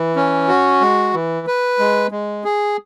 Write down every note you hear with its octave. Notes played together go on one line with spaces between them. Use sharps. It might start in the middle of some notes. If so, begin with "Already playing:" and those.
Already playing: E3
C#4
F#4
G#3
E3
B4
G#3
G#3
G#4